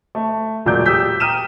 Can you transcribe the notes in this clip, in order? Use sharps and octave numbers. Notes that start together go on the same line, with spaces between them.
A3
E1 A#2 F#3 D5 G6
G4 D#6 E6 G6 B6
G5 A#5 D#6 F6 D#7 E7